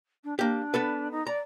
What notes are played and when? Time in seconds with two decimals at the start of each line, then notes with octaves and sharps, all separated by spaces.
0.24 D4
0.39 A#3 D4 G4
0.74 B3 A4 B4
1.11 D#4
1.27 D5 A#5